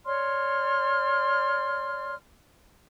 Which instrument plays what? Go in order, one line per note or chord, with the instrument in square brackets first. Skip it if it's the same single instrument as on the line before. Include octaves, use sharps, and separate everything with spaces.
[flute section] C#5 D5 C6 F6